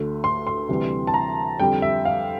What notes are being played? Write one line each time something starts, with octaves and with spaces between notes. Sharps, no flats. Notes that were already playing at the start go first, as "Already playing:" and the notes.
Already playing: D2 D3 A3
C6
C6
D2 C3 E3 G3
A5
A#5
F2 D3 G3 G5
E5
F5